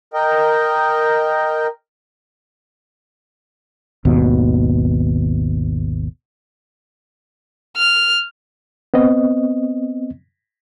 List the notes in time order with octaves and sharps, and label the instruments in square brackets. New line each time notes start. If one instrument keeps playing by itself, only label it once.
[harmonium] A#4 D#5 G5
[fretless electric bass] G#1 D#2 B2
[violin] F6
[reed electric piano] B3 C4 D#5